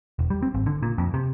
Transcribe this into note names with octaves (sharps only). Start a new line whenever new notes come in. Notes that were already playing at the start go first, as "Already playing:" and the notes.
E1
G3
C4
G#1
D3
A#2
F2
C3